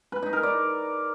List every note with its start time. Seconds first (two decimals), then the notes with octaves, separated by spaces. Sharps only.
0.12 B4
0.23 D#4
0.33 A#4
0.43 D5